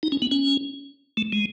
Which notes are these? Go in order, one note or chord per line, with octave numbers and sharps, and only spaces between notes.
D#4
C#4
B3
C#4
A3
G#3